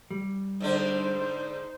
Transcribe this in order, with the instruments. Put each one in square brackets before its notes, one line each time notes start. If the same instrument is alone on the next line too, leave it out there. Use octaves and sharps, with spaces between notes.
[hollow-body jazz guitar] G3
[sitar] G#2 D3 D4 [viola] D#4 C5